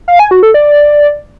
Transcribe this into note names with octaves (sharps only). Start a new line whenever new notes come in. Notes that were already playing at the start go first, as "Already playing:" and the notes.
F5
G#5
F#4
A4
D5